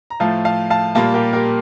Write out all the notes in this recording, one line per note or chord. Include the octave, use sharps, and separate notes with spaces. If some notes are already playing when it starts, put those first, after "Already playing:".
A#5
A2 F3 A3 F5 A5
F5 A5
F5 A5
A#2 G3 A#3 F5 A5
G4 A#4
G4 A#4